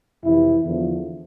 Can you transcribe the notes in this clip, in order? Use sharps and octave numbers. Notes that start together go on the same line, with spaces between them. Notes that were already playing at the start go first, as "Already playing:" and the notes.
F2 C3 E3 E4
E2 D3 F3